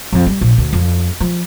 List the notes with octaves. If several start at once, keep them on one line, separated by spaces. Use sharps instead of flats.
F2
G3
A#1
D2
F2
F3